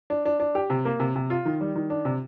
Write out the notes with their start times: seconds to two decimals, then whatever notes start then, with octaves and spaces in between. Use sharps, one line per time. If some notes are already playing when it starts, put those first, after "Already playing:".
0.10 D4
0.25 D4
0.40 D4
0.55 G4
0.70 C3
0.85 A#3
1.00 C3
1.16 C3
1.30 F4
1.46 D#3
1.61 G3
1.76 D#3
1.90 D4
2.05 C3